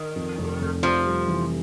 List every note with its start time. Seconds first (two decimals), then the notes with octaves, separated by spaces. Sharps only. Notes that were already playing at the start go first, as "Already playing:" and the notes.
Already playing: D#3
0.16 F2
0.38 F1
0.61 F1
0.83 C3 F3
1.06 G3
1.28 E3